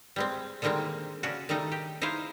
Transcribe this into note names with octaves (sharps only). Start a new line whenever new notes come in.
G3 G#3 C4
D3 D#3 G3 G#3 A#3 C4
C#3 C#4 D4 F#4
D#3 G3 A3 D#4
G4
D#4 E4 G#4 C5 F5